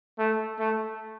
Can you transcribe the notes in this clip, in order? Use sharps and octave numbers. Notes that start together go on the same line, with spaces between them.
A3
A3